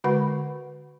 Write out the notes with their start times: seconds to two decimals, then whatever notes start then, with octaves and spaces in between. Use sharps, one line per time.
0.04 D3 G#3 F#4 B4 F#5 B5